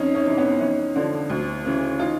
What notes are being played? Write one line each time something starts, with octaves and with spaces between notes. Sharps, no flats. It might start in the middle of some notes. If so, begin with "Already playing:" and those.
Already playing: F2 C#4 D#4
C#4 D#4
C3 E3
B3 C#4
F2 C#4 D#4
D3 F3
D2
C#3 E3
D#4 F4